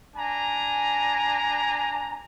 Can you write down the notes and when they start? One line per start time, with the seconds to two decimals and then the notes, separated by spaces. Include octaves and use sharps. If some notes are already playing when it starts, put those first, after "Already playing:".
0.16 D4 G#5 A#5